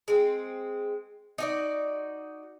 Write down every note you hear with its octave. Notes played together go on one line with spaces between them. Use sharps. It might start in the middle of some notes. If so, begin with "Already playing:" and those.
G#3 C4
D#4 F#4 D5